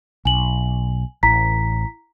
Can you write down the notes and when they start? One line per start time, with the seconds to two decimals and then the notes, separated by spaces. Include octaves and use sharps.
0.25 B1 G#5 F#7
1.23 A1 E4 A#5 B6